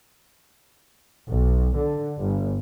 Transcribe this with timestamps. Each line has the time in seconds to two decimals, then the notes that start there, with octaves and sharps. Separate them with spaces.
1.28 B1
1.75 D3
2.18 G1